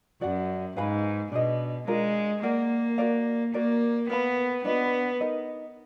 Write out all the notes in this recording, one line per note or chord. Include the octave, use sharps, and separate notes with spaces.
F#2 F#4 D5 F#5
G#2 B4 F5 G#5 B5
B2 D4 G#4 D#5
G#3 D4 F4 A#4
A#3 A#4 D5 F#5
F#4 A#4 D5 F5
A#3 F#4 A#4 D5
B3 A#4 F5 B5
B3 D4 F4 B4 D#5
D#4 A#4 D#5